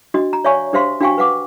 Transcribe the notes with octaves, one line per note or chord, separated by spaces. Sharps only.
D4 F#4 D#5
A#5
C#5 D5 E5 F5 G#5 C#6
D4 G4 C5 E5 F5 C6
D4 F#4 F5 G5 G#5 C#6
B4 F5 F#5 D6